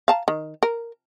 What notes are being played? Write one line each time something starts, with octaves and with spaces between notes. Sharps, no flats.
F5 A5 A#5
D#3
A#4